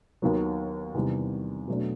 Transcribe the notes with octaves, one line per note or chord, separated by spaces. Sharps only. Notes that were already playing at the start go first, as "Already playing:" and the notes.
D#2 D#3 F#3 B3
E2 C3 D#3 G3
B2 F#3 A3 D4